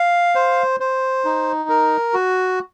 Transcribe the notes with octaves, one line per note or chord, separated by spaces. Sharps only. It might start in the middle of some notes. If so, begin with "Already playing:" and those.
Already playing: F5
C5
C5
D#4
A#4
F#4